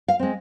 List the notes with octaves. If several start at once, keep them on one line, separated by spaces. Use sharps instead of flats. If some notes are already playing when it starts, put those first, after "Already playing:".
F5
G#3 C4